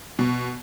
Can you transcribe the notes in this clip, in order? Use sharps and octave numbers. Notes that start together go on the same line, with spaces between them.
B2